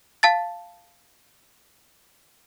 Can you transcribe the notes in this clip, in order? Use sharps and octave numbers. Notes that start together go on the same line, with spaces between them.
F5 A5 A6